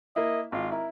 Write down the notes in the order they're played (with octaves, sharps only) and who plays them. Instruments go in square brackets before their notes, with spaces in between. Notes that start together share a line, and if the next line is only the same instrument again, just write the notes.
[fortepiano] A#3 E4 [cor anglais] D#5
[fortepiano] G#1 [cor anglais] F4
[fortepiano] E4 [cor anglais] A#4